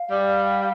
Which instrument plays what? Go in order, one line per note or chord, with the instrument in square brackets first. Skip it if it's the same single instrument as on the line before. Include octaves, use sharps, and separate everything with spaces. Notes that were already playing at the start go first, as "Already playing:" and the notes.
Already playing: [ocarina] F5
[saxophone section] G3